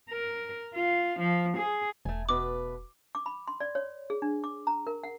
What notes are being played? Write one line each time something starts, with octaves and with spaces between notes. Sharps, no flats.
A#4
F4
F3
G#4
E1 A3 G#5
B2 B4 D6
D6
B5
C6
D5
C#5
G#4
D4
D6
A#5
A#4
F#5